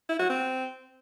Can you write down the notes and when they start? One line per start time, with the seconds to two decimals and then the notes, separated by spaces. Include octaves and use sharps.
0.09 E4
0.19 F#4
0.30 C4